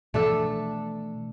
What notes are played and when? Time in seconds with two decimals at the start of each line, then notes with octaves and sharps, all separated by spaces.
0.14 B2 E3 F3 A3 D4 A4